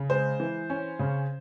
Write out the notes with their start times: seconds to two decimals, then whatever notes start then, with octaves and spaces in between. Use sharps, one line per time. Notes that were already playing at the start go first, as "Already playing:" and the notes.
Already playing: C#3
0.10 G#3 C5
0.40 E3
0.70 C#4
0.99 C#3